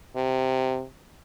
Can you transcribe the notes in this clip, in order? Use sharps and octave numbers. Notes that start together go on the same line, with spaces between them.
C3